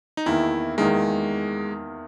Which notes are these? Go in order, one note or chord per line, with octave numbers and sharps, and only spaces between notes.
D#4
E2 D#3 A#3 E4
E2 D#3 G#3 A#3